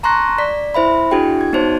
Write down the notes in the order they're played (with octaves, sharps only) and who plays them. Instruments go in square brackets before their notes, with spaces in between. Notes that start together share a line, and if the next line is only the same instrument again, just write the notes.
[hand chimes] A5 A#5 C6 C#6 F#6 A#6
D5 B6
E4 C5 E5 B5
D4 E4 F#4 G#4 G5
G#6
B3 D#4 F#4 C5 C#5 A5